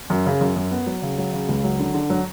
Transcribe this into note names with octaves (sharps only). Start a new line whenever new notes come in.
F#2
C#3
F#2
F#2
B3
F#3
C#3
F#3
C#3
C#2
F#3
D3
D3
F#3